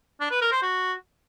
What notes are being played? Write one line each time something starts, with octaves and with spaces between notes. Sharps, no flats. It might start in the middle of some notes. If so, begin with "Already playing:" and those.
D4
B4
A#4
C5
F#4